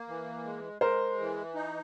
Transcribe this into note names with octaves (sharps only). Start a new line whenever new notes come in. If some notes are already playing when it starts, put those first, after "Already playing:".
Already playing: A#3
E3
G#3
G#3 A#4 C5
E3
D#4